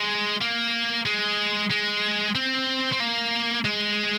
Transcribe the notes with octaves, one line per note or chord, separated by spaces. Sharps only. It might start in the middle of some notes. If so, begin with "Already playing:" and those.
Already playing: G#3
A#3
G#3
G#3
C4
C4
A#3
G#3